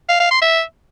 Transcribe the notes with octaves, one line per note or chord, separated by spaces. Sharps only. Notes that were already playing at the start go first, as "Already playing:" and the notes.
F5
F5
C6
E5